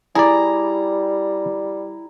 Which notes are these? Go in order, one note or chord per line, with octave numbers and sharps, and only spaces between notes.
G3 E4 G#4 D5 A#5